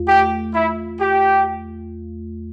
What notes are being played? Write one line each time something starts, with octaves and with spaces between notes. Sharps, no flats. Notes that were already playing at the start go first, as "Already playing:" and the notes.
Already playing: E2 A3 F4
G4
E4
G4